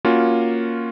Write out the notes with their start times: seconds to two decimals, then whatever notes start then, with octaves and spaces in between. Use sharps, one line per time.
0.05 A#3 C#4 F4 F#4